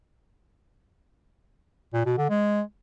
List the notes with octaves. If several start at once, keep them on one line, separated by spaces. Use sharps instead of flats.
A#2
B2
D3
G#3